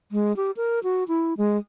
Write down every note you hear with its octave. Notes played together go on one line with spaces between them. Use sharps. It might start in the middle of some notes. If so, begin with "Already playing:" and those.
G#3
G4
A#4
F#4
E4
G#3